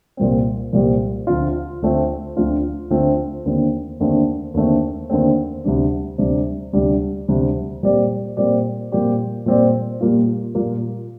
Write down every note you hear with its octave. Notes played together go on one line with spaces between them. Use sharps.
C2 A#2 G3 C4
C2 A#2 G3 C4
D2 D3 A3 C4 F4
D2 D3 A3 C4 F4
D2 D3 A3 C4 F4
D2 D3 A3 C4 F4
D#2 D3 A3 C4
D#2 D3 A3 C4
D#2 D3 A3 C4
D#2 D3 A3 C4
D2 C3 G3 D4
D2 C3 G3 D4
D2 C3 G3 D4
D2 C3 G3 D4
A#2 G3 C4 G4 D5
A#2 G3 C4 G4 D5
A#2 G3 C4 G4 D5
A#2 G3 C4 G4 D5
A#2 G3 A#3 F4
A#2 G3 A#3 F4